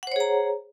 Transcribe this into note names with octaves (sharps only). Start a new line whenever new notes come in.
G#4 C5 C#5 F#5 A#5